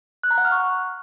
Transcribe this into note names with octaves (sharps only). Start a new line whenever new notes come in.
F#6
A#5
F#5
F6
C#6